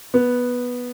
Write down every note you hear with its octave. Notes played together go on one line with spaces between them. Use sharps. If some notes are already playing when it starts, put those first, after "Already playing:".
B3